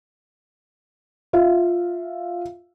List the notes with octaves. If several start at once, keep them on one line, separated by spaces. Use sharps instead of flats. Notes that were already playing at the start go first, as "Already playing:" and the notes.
F4 E5 F5